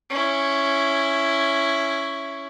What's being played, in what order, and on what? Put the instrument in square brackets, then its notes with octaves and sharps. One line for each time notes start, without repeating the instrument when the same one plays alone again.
[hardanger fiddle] C#4 E4